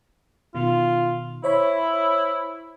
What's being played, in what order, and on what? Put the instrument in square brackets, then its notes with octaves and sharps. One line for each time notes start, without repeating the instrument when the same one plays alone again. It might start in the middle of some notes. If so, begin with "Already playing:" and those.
[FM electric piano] B2 D#3 [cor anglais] F4
[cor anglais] E4 [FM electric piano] C5 C#5 B5